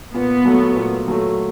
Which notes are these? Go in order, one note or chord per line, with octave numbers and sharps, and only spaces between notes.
A#2 B3
F#3 A3
A#2
F#3 A3